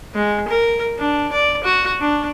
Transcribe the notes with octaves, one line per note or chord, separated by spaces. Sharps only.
G#3
A#4
D4
D5
F#4
D4